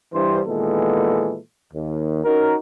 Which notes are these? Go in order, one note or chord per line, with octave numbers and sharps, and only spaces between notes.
G2 E3 C5
A#2 D#3 E3 G#3 B3 A4
D#2
C#4 D#4 F#4 A#4